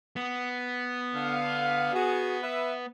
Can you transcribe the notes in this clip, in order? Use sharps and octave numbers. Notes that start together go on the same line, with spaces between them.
B3
D3 F5
F#4 G#4
B4 E5